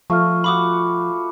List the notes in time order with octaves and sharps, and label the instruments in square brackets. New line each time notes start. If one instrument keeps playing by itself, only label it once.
[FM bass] F3 [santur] A3 F4 D#5 [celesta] C#6 F6
[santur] F4 F#4 [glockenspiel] B5 D6 D#6